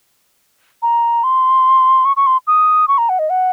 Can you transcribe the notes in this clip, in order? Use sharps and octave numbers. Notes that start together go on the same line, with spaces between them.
A#5
C6
C#6
C#6
C6
D#6
C#6
A#5
F#5
D#5
F#5